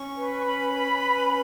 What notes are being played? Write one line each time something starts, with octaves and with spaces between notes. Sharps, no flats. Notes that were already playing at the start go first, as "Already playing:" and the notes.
Already playing: C#4 C#6
B4
C#6
C#4 B5
B4
C#4